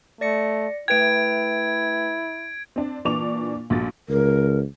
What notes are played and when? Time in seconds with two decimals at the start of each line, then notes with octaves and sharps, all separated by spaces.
0.21 A3 D5 A#6 C#7
0.88 A3 E4 B4 G5 G#6 D7
2.76 C4 D4
3.05 A#2 E3 D4 C#6 D6 F7
3.70 A#1 A3 F#4 A6
4.09 C#2 A#4